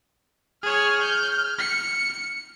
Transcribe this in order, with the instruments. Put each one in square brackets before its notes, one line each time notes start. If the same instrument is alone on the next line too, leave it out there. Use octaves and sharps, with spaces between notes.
[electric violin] G#4 C#5 [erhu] F6
[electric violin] G6
C#7